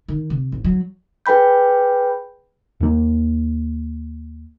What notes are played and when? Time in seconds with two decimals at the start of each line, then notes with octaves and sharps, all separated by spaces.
0.09 D#3
0.30 C3
0.52 A1
0.65 F#3
1.26 G#4 B4 G5 B5 G6
2.80 D#2 A#3